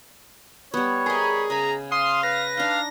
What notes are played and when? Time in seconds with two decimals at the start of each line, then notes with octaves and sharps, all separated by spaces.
0.74 G3 B3 C#5
1.06 G#4 A#4 D#5 B5
1.50 C#3 G#5 A#5 B5
1.92 F5 C6 D#6
2.23 B4 A#6
2.57 D4 D#4 F5